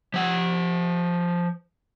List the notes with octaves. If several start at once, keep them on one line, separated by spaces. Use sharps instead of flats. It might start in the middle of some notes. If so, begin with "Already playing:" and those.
F3 F#5